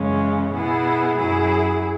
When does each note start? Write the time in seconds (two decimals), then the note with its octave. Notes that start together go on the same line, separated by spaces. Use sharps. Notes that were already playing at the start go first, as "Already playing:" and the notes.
Already playing: F#2 C#3 E3 G#3 C#4
0.53 B2 B3 E4 G#4
1.17 F#2 F#3 E4 G#4